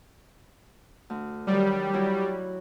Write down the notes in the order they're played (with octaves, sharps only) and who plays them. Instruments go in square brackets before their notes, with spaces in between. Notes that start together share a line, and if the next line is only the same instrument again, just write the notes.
[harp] D2
[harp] D#3 F#3 [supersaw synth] G3
[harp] F#3 E4 F#4